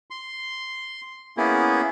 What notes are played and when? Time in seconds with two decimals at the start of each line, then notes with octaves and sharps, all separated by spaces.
0.10 C6
1.37 A#3 B3 C#4 E4 G#4